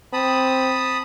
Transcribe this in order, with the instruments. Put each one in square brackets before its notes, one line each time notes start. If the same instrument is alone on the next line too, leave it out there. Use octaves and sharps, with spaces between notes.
[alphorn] C4 [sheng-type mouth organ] A5 B5 D#6